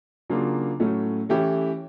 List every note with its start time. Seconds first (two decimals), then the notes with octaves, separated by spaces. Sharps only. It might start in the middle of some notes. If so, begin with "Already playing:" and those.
0.30 C#3 F#3 A#3 D4 F4
0.80 A2 F#3 A3 C#4
1.29 E3 A3 C#4 E4 G4